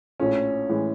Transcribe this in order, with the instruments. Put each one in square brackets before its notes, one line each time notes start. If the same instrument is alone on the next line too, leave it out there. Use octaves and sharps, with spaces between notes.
[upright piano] A#1 A2 F3 A3 [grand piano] C#4
[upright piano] A2 E3 G#3